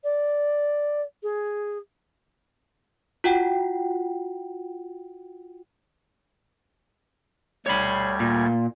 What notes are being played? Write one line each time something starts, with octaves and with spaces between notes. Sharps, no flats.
D5
G#4
F4 F#4 F#5 G5
D2 G3 C#5 B5 G#6
A#2